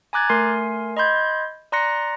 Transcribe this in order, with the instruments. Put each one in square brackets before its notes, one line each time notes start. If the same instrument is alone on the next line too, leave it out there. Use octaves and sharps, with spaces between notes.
[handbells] G#5 A#5 D6 F#6 G#6 A6
A3 A#4 G#5 C6 C7
D#5 B5 C6 G6 G#6
D5 A#5 C6 F#6 A#6 C#7